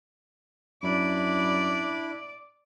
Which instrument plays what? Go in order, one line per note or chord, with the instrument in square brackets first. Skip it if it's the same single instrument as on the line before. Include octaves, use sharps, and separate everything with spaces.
[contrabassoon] F#2 [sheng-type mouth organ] D4 E4 B5 [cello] D5